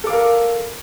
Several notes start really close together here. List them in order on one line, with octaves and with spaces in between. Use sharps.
A4 D6 F5 A#4